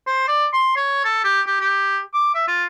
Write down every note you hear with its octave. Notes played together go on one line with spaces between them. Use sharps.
C5
D5
C6
C#5
A4
G4
G4
G4
D6
E5
F4